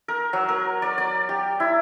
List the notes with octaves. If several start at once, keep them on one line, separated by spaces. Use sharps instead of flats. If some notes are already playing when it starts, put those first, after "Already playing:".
A#4
F#3
A#4
D5
D5
G4
E4